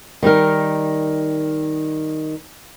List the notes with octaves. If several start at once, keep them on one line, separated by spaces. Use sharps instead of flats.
D#3 G3 D#4 A#4